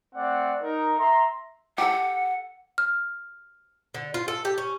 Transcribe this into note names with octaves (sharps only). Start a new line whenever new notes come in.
A3 C4 D5 F#5
D#4 A#4
E5 A#5 C6
G4 A4 F#5
F6
D3
F4
A4
G4
C#4